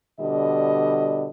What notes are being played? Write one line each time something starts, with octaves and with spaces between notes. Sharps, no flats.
B2 D3 G3 D#5